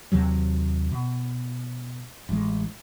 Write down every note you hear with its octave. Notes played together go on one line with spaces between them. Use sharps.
D#2 C3 F#3
B2
A1 G#3